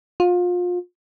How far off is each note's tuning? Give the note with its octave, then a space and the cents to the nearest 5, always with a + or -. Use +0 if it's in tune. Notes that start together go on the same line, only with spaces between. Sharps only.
F4 +30